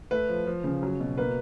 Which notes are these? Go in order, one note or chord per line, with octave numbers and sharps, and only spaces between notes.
A3 B4
F3
F3
C#3
F#3
B2
A#3 B4